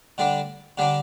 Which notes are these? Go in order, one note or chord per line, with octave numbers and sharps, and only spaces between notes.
D3 G3 D4
D3 G3 D4